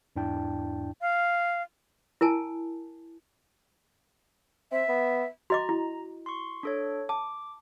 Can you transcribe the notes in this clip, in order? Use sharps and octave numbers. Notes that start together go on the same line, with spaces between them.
E2 G#2 D4 E4 G5 A5
F5
E4 A#4 G#5 A5
C4 E5
B3
F#4 D#5 A#5 D6
E4
C6 C#6
D4 A4 C#5
A5 D6